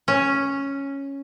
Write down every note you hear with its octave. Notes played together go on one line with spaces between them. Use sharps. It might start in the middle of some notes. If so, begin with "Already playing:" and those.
C#4